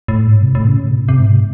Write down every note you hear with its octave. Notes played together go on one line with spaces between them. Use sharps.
A2
G#2
C3
A2
C#3
A2
C3
A2
C3
G#2